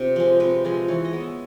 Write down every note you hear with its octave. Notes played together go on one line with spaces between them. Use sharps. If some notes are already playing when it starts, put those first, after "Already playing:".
Already playing: C3 F4
F3 G#3
C3 B4
F3 G#3
E3 C#5
D#5
G#3 B3
E5